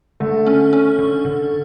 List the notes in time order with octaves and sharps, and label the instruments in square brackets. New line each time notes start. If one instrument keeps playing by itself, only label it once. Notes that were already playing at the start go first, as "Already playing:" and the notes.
[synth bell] D3 [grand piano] A3
[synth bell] C#4
C#4
D3
D3